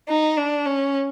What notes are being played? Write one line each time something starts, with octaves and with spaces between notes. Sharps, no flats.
D#4
D4
C#4